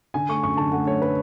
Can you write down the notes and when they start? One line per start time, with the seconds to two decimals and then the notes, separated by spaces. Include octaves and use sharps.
0.14 D3 G#5
0.29 A3 C#6
0.43 F#2 C#6
0.57 D3 A5
0.72 A3 F#5
0.86 A3 C#5
1.01 A3 B4